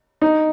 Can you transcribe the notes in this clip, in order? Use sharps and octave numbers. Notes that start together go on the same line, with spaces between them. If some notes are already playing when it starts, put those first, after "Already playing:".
D#4